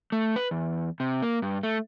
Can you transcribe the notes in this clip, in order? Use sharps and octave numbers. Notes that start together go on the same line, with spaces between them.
A3
B4
E2
C3
A#3
G2
A3